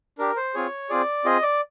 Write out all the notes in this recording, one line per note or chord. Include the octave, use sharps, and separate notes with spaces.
D4 G4 A#4
C5
C4 F4 G#4 C#5
C4 F4 G#4 D5
C4 F4 G#4 D#5
D5